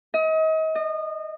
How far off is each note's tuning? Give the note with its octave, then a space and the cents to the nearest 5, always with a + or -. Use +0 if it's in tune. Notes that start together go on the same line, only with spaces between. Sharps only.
D#5 +35
D#5 -30